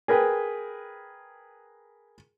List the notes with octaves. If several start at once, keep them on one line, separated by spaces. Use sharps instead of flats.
G#4 A#4 B4 G5